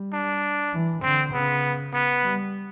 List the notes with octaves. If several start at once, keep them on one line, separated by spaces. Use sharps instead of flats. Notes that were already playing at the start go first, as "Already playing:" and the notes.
Already playing: G3
D4
E3
D3 C4
C#3 B3
B3
G3